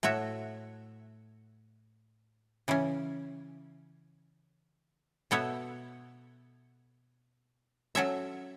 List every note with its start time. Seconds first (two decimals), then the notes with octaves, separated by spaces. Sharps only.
0.03 A2 A3 F#4 C#5 E5
2.68 C#3 E3 C#4
5.31 B2 B3 A4 C#5 E5
7.95 F#3 C#4 A4 C#5 E5